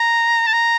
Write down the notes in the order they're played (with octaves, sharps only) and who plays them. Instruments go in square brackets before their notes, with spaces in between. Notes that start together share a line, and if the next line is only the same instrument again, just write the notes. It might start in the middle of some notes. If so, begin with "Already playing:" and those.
Already playing: [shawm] A#5
A5
A#5